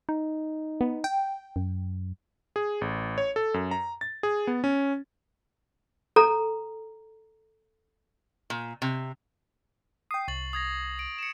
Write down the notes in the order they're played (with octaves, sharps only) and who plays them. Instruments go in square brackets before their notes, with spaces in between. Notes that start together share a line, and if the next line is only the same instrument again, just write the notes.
[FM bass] D#4
[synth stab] B3
G5
[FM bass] F#2
[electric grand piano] G#4
A1
C#5
A4
F#2
A#5
A6
G#4
B3
C#4
[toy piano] A4 A#5
[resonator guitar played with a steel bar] A#2
C3
[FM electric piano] G5 D#6 [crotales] C7
[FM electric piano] C2 [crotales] C#6 A6 F#7
[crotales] D#6 G#6 A#6
D7
C#7 E7